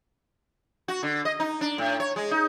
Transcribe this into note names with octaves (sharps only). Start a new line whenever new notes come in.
F#4
D3
D#5
D#4
D4
A2
C#5
G#3
D#4